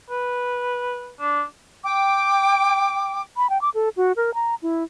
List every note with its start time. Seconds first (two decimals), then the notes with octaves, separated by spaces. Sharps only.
0.11 B4
1.20 D4
1.84 G5 D6
3.37 B5
3.50 G5
3.61 D6
3.75 A4
3.97 F#4
4.16 A#4
4.34 A#5
4.62 E4